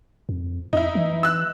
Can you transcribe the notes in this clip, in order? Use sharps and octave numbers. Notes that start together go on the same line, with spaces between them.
F2
F2 D#4 E4
E3
E6 F#6